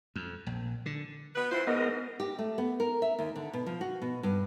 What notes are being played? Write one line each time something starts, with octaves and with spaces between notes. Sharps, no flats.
F2
A#1
D3
B3 B4
E3 F4 C5
G#2 B3 A#4 D#5
G4
A3
B3
A#4
E5
D#2
D3
B2
F3
F#4
B2
G2